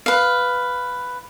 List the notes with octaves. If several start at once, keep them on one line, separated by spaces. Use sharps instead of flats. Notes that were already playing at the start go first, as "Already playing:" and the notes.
B4 F5